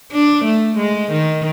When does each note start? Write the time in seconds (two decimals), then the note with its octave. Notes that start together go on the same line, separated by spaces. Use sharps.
0.12 D4
0.45 A3
0.78 G#3
1.11 D#3